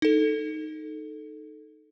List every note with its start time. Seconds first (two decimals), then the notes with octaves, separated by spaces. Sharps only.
0.02 D#4 A4